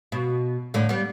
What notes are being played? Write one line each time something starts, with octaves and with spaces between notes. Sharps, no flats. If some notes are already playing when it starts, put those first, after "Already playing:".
B2
A2 D3
G3 B3